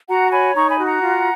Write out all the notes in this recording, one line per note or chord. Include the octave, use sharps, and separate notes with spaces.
F#4 F#5 A#5
C#5 G#5 B5
D#4 A#5 C#6
G#5 B5
F#4
F#5 A#5
F4